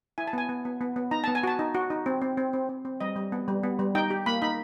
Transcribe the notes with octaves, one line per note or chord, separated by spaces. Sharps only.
E4 G#5
A5
B3 G#5
B3
B3
B3
B3
D#4 A#5
B3 A5
G#5
F#4 A5
D#4
F#4
D#4
C4
C4
C4
C4
C4
C4
G3 D#5
G3
B3
G3
B3
G3
D#4 G5
G4
A#3 B5
D#4 B5